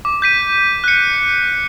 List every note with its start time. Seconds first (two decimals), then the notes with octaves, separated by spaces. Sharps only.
0.05 D6
0.22 G6 B6 D#7
0.84 F#6 C#7